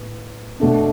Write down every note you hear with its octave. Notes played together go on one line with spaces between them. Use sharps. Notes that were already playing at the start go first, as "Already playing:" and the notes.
Already playing: A2 B3
B2 A3 D4